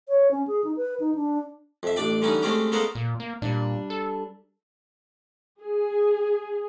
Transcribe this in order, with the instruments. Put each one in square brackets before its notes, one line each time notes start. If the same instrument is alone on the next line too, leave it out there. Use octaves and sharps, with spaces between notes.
[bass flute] C#5
C#4
G#4
D#4
B4
D#4
D4
[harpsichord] F2 E5
A1 D4 D5 G5
D3 E3 G3 C#4 D#4
G#3 A3 C4 C#4 G4
C#3 G#3 B3 A4 A#4 C5
[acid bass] A#2
A#3
[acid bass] A#2 [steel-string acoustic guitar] G3 D4
[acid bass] A4
[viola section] G#4